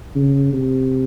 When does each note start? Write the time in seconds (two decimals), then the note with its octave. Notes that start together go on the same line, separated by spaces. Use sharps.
0.15 C#3
0.53 C3